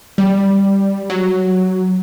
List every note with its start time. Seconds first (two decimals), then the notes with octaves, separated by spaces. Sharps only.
0.18 G3
1.10 F#3